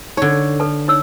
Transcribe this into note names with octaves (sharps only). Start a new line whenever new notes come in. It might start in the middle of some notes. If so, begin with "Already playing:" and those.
D3 D#4 C#5
A4 B4 A5
D#4 C#5 E6